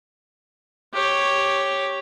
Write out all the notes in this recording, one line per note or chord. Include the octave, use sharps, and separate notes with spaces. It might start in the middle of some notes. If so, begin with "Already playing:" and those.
G4 C#5